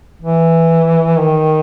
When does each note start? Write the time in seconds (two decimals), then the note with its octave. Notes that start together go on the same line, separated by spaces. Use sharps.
0.22 E3
1.19 D#3